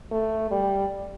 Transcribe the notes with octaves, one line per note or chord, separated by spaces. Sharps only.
A3
G3